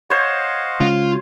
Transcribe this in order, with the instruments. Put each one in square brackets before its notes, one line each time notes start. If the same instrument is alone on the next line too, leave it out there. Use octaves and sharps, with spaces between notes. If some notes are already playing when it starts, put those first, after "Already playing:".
[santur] C5 C#5 [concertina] D#5 F5 F#5
[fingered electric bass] C#3 G#3 C#4 [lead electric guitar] F4